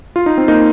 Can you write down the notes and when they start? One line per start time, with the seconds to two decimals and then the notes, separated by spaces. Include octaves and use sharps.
0.16 F4
0.26 D#4
0.38 C4
0.48 A#3 D#4